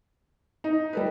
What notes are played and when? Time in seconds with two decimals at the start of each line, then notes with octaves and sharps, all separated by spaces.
0.64 D#4
0.93 G3 A4 B4